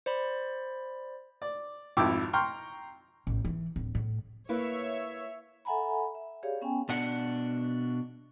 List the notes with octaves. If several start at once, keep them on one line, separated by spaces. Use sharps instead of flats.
C5 D5 B5
D5
G#1 F2 E4 G5 D6 E6
G5 A#5 C6 C#6 F6
A1
E3
D1
A2
A#3 E4 B4 C#5 E5
A4 E5 F#5 G#5 A#5 B5
E5
G4 G#4 C#5 D5 F5
B3 C#4 G5 G#5
B2 D4 F#5